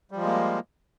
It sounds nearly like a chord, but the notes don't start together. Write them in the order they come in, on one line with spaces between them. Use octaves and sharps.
G3 F3 G#3 A#3